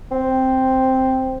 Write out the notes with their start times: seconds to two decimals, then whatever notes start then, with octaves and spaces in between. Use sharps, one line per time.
0.12 C4